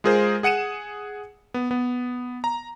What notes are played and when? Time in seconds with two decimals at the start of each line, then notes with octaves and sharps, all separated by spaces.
0.04 G#3 F4 G#4 A#4 C5
0.43 G#4 F#5 C#7 D#7 E7
1.54 B3
1.71 B3
2.44 A#5